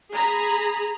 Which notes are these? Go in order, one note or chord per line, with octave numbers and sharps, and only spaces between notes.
G#4 A#5 B5